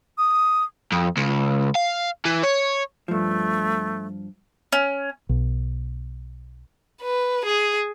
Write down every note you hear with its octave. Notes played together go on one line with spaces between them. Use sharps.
D#6
F2
C#2
F5
E3
C#5
G2 F3 A3
C#4
B1
B4
G#4